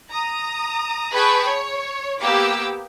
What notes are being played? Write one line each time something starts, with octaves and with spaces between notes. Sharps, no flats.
A#5 D#6
G#4 B4 G5 A5 B5 C#6
C#5
A#3 B3 G4 D6 E6